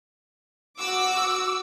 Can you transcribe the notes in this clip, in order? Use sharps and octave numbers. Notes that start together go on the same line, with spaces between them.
F#4 D6 E6